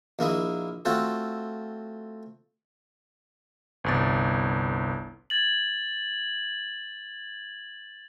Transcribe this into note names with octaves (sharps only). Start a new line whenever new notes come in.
A#1 A#3 E4 D#5
A3 C4 F4 F#4 A4
G1 C2 A6
G#6 A6 F#7